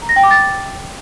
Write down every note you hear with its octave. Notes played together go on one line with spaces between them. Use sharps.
A#5
A#6
G5
D6
A6